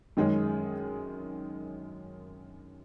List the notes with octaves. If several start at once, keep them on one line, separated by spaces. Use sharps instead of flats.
F#2 D#3 G#3 C#4 G#4